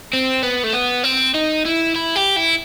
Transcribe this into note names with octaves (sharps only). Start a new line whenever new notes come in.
C4
B3
A3
B3
C4
D#4
E4
E4
G4
E4